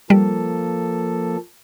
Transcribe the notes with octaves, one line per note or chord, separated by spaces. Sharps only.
F3 G3 A#3 A4